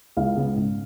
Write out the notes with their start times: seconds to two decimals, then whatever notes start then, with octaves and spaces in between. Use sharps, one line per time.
0.17 C#2 F5
0.36 C#3 G#3 B3
0.56 G#2